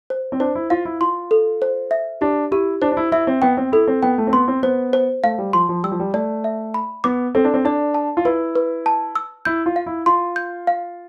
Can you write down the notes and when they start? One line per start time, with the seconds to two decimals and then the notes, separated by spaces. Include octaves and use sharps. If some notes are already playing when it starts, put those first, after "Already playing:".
0.10 C5
0.32 C4
0.40 D4 C5
0.55 E4
0.70 F4 F5
0.85 E4
1.01 F4 C6
1.31 A4
1.62 C5
1.91 E5
2.21 D4 G4
2.51 E4 G4
2.82 D4 C5
2.92 D4
2.97 E4
3.12 E4 E5
3.27 C4
3.42 B3 G5
3.57 C4
3.72 E4 A4
3.87 C4
4.03 B3 G5
4.18 A3
4.27 C4
4.33 B3 C6
4.48 C4
4.63 B3 C5
4.93 C5
5.23 A3 F5
5.38 G3
5.53 F3 C6
5.69 F3
5.83 G3 E6
5.91 F3
6.00 G3
6.14 A3 D5
6.44 E5
6.74 B5
7.04 B3 D6
7.35 C4 A4
7.44 D4
7.54 C4
7.65 D4 D5
7.94 A5
8.17 F4
8.25 E4 B4
8.56 B4
8.86 A5
9.15 E6
9.45 E4 G6
9.66 F4
9.76 F5
9.86 E4
10.06 F4 C6
10.36 G6
10.67 F5